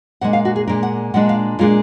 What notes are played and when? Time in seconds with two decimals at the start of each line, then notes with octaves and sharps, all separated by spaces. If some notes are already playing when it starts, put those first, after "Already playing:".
0.21 A#2 G#3 D4 F#5
0.33 F5
0.45 F#4
0.56 G#4
0.67 A#2 G#3 D4 A#4
0.83 F#5
1.14 A#2 G#3 D4 F#5
1.29 F5
1.59 A#2 G#3 D4 F4